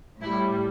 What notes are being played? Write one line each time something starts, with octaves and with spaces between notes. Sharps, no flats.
A2 G3 E4